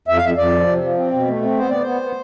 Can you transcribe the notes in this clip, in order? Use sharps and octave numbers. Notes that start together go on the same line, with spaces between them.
F2 E5
F5
F2 E5
F2 D5
F3
C3
F3
C4
B2
A3
C4
B3 C5
B3 D5
B3 C5
B3